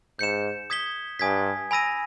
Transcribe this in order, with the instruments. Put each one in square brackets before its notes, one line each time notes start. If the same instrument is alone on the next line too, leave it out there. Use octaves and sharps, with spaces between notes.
[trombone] G#2 [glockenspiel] G6 C#7 E7
[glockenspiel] D#6 G#6 B6 G7
[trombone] G2 [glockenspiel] G#5 D#6 G#6 B6
[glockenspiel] G#5 B5 E6 A#6 D#7